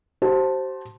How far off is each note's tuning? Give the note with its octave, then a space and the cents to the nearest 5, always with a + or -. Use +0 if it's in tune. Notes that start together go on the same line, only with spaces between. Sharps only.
G4 -45 C5 +10 A5 +0